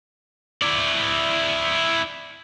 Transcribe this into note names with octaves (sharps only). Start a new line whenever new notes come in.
E4 D5